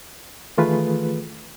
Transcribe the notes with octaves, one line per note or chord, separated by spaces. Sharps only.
D#3 E3 A3 F4 G#4 B4